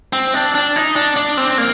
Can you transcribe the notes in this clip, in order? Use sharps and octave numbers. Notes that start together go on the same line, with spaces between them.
C4
D4
D4
D#4
D4
D4
C4
A#3